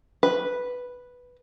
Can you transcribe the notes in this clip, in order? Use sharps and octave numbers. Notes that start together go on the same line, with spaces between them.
B4